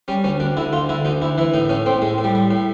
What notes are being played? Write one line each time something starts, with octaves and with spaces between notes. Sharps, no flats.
G3 C#4
D2 C#4
D2 D4
D3 E4
D2 F4
D3 E4
D2 D#4
D2 E4
E3 E4
A2 D#4
A2 C#4
A2 C4
A2 G#3
A2
G3
G3
A2